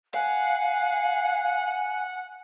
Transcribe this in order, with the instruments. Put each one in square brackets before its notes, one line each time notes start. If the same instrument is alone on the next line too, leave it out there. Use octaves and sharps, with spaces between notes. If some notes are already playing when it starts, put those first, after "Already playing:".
[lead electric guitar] F5 [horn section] F#5 [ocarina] G#5